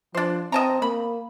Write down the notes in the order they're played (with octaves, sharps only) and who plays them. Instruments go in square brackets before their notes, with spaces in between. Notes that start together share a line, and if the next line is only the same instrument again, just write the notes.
[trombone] F3 [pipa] D4 C5
[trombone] C4 [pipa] D#5 A5 A#5
[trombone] A#3 [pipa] B5